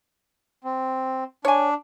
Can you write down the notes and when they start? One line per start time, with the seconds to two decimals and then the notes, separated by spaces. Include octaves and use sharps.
0.64 C4
1.45 D4 C#5 G#5